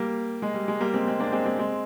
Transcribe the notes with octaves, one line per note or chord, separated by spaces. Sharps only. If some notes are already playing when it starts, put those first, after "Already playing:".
Already playing: G3 A#3
G#3
G3
G#3
G3 A#3
G#3 C4
G#3 C4
A#3 D4
G#3 C4
G#3 C4
G#3 C4